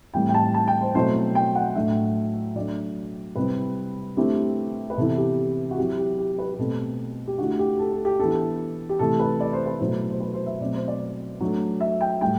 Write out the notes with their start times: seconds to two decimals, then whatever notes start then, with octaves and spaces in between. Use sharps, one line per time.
0.14 A2 E3 G3 C4 G5
0.29 G5
0.34 A5
0.54 A5
0.68 G5
0.81 C5
0.95 B2 F#3 A3 C4 E4 C5
1.35 G5
1.55 F#5
1.75 A2 F#3 A3 D4 E5
2.56 F#3 A3 D4 D5
3.35 C3 G3 C4 E4 B4
4.17 D3 A3 C4 E4 G4
4.90 B4
4.97 C3 E3 B3 E4 A4
5.18 G4
5.71 F#4
5.78 F#3 C4 E4 G4
5.98 G4
6.18 G4
6.38 B4
6.54 G4
6.58 B2 A3 C4 A4
7.27 G4
7.38 D3 A3 E4 F#4
7.59 G4
7.79 A4
7.92 A4
8.05 G4
8.19 E3 B3 D4 A4
8.89 G4
8.99 C3 E3 A3 A4
9.20 B4
9.40 D5
9.53 C5
9.66 B4
9.79 B2 F#3 A3 E4 C5
10.10 C5
10.20 B4
10.34 C5
10.46 E5
10.60 B2 F#3 A3 C4 D5
10.74 C5
10.88 D5
11.40 F#3 A3 D4
11.81 E5
12.01 G5
12.21 A2 G3 G5